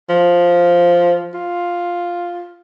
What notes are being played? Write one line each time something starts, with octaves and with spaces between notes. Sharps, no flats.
F3
F4